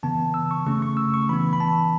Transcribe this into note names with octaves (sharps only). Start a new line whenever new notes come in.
C#3 E3 B3 A5
E6
C#6
C#3 A3 C#4 C#6
C#6
E6
C#6
E3 B3 B5
B5
A5